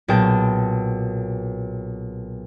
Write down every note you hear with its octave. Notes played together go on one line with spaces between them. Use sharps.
B1 A#2 G#4 G5 A5 D7